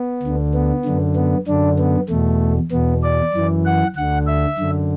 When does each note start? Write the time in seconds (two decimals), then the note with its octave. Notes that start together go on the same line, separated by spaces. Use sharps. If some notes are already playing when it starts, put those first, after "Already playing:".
Already playing: B3
0.23 D2 D3
0.54 B3
0.85 F#2 D3
1.16 B3
1.48 F#2 D3 D4
1.79 B3
2.09 E2 B2 A3
2.71 E2 B2 B3
3.03 D5
3.34 F#2 E3
3.65 F#5
3.96 D2 D3 F#5
4.27 E5
4.58 F#2 D3